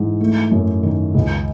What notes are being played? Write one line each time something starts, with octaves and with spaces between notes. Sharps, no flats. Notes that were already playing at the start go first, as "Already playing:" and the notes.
Already playing: G#2 E3
A3
F#2
D#3
C#2